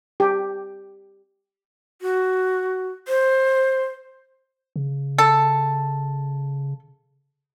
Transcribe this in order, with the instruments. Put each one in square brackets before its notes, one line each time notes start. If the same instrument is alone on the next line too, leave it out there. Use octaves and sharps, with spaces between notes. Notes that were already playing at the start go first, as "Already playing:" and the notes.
[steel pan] G4
[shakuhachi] F#4
C5
[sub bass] C#3
[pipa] A4